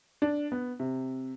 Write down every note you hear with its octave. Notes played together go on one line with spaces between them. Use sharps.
D4
B3
C3